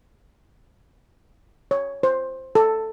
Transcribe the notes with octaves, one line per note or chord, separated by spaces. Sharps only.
C#5
C5
A4